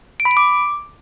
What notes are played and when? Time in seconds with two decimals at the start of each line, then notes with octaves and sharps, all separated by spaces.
0.20 D7
0.25 B5
0.31 D7
0.37 D6